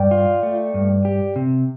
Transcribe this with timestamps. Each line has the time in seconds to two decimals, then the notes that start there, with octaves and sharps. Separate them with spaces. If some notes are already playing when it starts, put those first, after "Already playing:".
Already playing: G2 D5 G5
0.11 F4
0.43 A3
0.74 G2
1.05 G4
1.36 C3